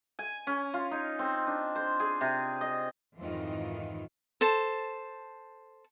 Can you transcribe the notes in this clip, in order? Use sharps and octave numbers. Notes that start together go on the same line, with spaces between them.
G#5
C#4
F4
D#4
C4
D4
C5
G#4
C3
D#5
F2 G#2 D#3 E3 F4
A4 C5 A5